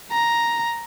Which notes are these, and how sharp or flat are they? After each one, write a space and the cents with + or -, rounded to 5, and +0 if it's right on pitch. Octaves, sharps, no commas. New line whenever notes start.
A#5 +5